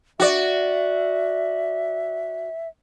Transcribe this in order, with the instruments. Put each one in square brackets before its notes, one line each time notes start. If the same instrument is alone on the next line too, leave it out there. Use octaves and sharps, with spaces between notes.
[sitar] F#4 D5 [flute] E5